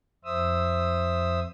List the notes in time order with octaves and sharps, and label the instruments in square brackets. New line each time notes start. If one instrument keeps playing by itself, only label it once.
[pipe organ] F2 C5 E5 D#6 E6